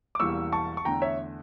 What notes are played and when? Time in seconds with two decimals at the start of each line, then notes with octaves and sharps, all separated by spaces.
0.15 D6
0.19 E1 E2 E3 G3 A#3 C#6 E6
0.52 A5 C#6
0.77 C#6
0.85 E2 D3 A3 G5 A#5
1.02 C#5 E5